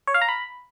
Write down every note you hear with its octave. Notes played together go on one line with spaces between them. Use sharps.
C#5
F5
A#5
B5